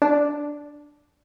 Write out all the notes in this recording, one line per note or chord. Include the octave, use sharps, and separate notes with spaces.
D4